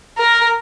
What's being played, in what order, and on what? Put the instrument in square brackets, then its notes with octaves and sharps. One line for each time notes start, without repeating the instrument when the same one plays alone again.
[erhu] A#4